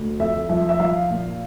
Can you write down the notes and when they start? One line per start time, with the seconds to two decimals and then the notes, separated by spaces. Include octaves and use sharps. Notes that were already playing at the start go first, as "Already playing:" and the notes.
Already playing: D2
0.20 F2 E5
0.49 F3 E5
0.69 E5
0.80 F3 F5
1.11 A#2